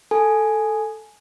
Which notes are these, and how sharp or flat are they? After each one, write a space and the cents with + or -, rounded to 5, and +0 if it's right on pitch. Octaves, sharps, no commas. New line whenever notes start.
A4 +0 G#5 +5